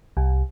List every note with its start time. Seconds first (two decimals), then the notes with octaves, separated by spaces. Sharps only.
0.17 C2